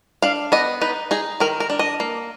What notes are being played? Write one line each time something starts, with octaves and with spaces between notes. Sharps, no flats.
D4 F5
B3 D#5
D#4 B4
D#4 G#4
D#3 A#4
A#4
D4
D#5
A#3